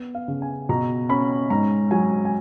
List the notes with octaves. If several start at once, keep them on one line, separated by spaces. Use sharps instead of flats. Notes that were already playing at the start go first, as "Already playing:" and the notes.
Already playing: B3
F5
C#3
G#5
B2 A#5
C#4 B5
G#2 A#5
F#3 G#5
G#5